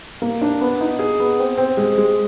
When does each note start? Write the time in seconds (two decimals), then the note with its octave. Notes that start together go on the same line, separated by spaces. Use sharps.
0.22 A#3
0.42 D4
0.61 B3
0.81 D#4
0.99 G#4
1.20 B3
1.39 C4
1.58 C4
1.77 G#3
1.98 G#3